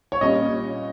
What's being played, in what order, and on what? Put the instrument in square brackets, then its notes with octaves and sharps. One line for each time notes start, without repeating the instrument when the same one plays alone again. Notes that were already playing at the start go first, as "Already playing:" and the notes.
[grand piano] C#5
[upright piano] A#2 G3 C#4 [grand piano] D#5